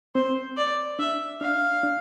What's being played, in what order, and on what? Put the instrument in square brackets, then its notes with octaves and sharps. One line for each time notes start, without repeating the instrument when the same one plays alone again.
[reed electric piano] C4 [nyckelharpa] C5
[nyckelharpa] D5
[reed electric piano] D4 [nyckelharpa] E5
[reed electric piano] D4 [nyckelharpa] F5
[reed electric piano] D4